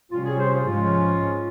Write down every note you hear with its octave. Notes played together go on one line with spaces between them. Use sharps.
C3 G3 C#4 F4
G#4
C5
F4
G#2 F3 G#3 C#4 F4